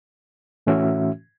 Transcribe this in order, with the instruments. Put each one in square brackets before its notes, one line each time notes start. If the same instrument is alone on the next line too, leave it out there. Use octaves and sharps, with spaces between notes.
[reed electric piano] A2 E3 A3 C#4 F#4 E5